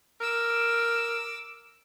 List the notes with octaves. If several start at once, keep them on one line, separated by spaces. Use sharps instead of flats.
A#4 D6 E6